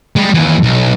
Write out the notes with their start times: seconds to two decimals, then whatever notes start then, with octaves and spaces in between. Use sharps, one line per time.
0.16 G3 G#3
0.34 D#2 E3
0.63 B1